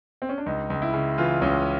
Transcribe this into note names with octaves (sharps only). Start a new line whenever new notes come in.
C4
C#4
D4
C#2 D#4
C#2
E4
C#3
E3 F4
C#2 C#4